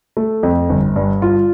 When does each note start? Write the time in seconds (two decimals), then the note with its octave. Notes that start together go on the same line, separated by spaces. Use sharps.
0.17 A3
0.43 F2
0.69 G1
0.96 G2
1.22 F4